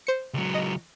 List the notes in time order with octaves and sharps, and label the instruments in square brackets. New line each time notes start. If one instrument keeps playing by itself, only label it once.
[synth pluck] C5 C#7
[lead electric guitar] C#2 F#3
[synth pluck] D#5